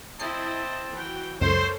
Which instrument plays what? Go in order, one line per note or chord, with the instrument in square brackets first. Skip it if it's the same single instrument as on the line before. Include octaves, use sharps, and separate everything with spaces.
[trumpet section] C4 A5 [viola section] E4 D#5 [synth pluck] C7 C#7
[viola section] E3 F#4 G5
[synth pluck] C#2 F#2 [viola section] A4 A#4 C#5 [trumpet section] C5